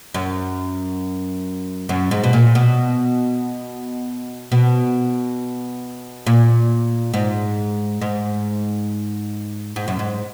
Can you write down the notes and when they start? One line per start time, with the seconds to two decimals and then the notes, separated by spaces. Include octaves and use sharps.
0.14 F#2
1.89 F#2
2.11 G#2
2.24 B2
2.33 A#2
2.55 B2
4.52 B2
6.27 A#2
7.14 G#2
8.02 G#2
9.76 G#2
9.88 F#2
9.99 G#2